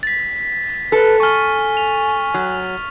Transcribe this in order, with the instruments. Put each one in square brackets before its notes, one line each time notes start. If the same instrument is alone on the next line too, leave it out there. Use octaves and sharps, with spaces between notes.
[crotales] A6 B6
[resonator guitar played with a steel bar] A4 [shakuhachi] B4
[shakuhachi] G#5 [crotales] C#6 F6
[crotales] F7
[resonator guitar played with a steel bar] F#3